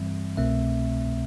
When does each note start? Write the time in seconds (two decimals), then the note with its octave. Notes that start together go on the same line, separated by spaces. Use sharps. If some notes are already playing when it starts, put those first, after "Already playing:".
Already playing: G2 E3 G3 C4 E5
0.37 C2 B2 A3 C4 E5